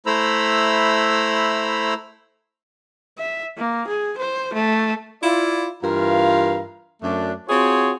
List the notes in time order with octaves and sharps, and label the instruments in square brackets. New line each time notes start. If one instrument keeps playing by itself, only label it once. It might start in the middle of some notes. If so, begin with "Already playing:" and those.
[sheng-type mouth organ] A3 E4 C5 A#5 B5 E6
[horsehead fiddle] E5
A#3
G#4
C5
A3
[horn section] E4 F4 D5
G2 E3 F4 A#4 F5 A#5
F#2 A3 D4
C4 F4 F#4 G#4 C5 C#5